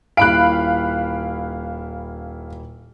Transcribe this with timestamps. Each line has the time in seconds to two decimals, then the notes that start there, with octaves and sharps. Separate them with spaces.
0.17 D#1 E4 F5 B5 F#6 D7